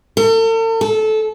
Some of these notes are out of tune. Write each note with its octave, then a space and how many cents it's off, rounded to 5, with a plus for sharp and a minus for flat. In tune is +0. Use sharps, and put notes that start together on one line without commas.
A4 +45
A4 -20